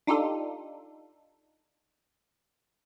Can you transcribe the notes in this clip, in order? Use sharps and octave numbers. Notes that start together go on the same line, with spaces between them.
D4 D#4 F4 G4 A4